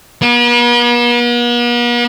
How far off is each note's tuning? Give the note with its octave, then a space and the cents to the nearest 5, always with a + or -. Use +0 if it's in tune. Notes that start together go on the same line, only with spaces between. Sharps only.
B3 -45